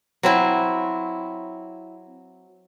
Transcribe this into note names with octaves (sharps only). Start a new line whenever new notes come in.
F#3 C4 E4